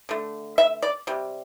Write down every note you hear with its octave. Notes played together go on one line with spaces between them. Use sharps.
D3 A3
E5
D5
C3 G3